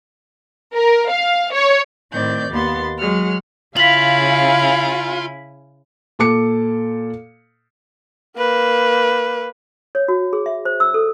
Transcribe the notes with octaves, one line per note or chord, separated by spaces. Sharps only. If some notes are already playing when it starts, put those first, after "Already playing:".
A#4
F5
C#5
A2 D#3 C4 D5 G6
D#2 A#3 B3 C6 A6
F#3 G#3 F#5 F6
C#3 E4 F4 F5 G#5 B6 F#7
A#2 A4 D6 C#7
A#3 B4
C#5
F#4
G#4
E5
C5
E6
A4